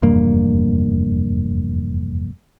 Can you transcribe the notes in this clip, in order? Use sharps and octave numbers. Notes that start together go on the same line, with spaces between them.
F1 E2 G2 A#3